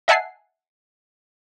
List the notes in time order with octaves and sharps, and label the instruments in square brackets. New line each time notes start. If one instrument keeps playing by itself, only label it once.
[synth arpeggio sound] D#5 E5 F#5 G#5 A5 C7